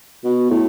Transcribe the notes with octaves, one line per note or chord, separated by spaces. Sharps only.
B2
A2